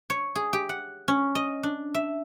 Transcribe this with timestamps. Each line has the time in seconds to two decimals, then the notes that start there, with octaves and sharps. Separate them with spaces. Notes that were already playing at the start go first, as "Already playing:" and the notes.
0.10 C#5
0.35 G#4
0.53 G4
0.69 F#5
1.08 C#4
1.35 D#5
1.63 D4
1.94 E5